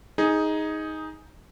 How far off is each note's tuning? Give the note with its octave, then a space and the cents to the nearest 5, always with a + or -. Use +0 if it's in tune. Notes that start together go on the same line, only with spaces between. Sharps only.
D#4 +10 G#4 +0